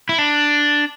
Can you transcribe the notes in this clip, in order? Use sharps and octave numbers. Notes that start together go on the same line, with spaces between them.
E4
D4